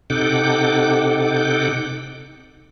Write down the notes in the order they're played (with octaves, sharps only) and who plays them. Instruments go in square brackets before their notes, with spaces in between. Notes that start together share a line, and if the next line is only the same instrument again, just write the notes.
[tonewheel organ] C3 D#4 A4 F#5 G5 D6